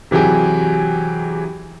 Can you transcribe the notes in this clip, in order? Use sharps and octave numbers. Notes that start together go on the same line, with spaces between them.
C3 E3 F#3 G4 G#4